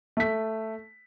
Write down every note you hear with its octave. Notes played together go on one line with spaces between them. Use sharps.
A3 B6